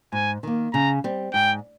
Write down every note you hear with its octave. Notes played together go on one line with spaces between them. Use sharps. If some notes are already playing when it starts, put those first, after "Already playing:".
G#2 G#5
D#3 A#3
C#3 A#5
G3 C4
G#2 G5